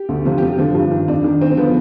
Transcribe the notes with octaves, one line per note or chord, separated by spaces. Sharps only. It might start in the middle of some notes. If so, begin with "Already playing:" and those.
Already playing: G4
D2
C3 F3
G4
F2 F4
D3 F3
G2
D#3
F2 D4
D#3
F2 C4
C4
D3 F3 B3